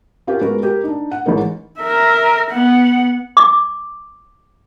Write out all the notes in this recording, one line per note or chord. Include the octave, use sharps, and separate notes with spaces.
C#4 F4 G4 A#4
G#3 B3 F#4 A#4
G4 A#4
D4 D#4
F#5
A1 E3 G#3 D#4 A#4
A#4 E5
B3 F#5
D6